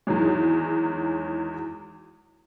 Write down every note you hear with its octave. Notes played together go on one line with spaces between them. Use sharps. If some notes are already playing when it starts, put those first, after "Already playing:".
E2 D#3 F#3 G#3